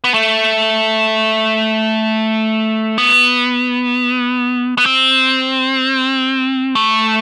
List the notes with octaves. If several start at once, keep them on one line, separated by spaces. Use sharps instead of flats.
B3
A3
B3
B3
C4
A3